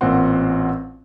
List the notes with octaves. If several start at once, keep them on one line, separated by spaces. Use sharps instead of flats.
A1 A#2 C4 F4 F#5 C6